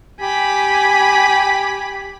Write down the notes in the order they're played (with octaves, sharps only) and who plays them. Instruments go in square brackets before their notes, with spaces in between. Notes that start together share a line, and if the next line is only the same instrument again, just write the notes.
[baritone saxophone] G4 [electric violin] G#5 B5